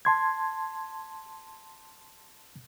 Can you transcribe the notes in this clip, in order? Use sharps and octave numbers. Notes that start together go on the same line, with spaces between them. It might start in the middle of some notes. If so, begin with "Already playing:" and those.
A5 C6 G#6